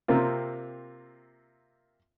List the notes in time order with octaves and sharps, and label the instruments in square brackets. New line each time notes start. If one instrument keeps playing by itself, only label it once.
[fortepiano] C3 A#3 C4 F4